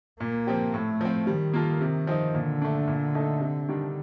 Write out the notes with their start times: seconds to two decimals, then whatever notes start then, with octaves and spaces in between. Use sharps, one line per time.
0.20 A#2 A#3
0.47 F3 C4 G4
0.74 A2 A3
1.01 F3 C4
1.27 D#3 G3
1.53 A#3 F4 A4
1.81 C3
2.07 F3 C4 D#4
2.34 A#2 D3
2.62 A3 D4
2.88 A#2
3.14 A3 D#4 A4
3.41 C3
3.68 D#3 G3 D4